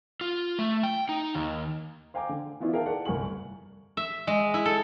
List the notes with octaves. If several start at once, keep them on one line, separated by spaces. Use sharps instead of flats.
F4
A3
G5
D#4
D#2
C5 F5 G5 G#5 A#5 D6
D3
D#3 E3 B3 E4 F4 D5
G#4 A#4 E5 F5 G5 A5
A#4 D5 F#5 A5
G1 C2 A#4 G#5 C#6 F#7
E5
G#3
E4
A4